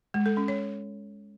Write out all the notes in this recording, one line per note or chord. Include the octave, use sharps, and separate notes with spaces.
G#3
A4
C#4
C#5